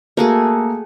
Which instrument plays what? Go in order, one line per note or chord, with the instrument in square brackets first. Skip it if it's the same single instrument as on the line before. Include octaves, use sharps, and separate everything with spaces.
[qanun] A3 F#4 G#4 [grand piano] A#3 A#4